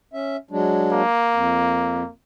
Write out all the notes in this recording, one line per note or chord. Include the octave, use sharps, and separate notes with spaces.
C#4 E5
F#3 G#3 D4
A#3
F2